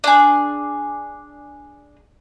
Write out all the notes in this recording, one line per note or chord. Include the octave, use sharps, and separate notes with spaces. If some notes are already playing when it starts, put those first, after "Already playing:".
D4 G#4